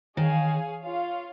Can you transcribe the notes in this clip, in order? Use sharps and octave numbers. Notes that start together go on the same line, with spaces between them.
D#3 G#4 C#5 F5 G#5
F4 C#5 F5